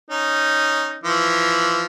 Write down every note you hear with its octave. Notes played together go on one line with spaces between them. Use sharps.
C#4 D#4
E3 F3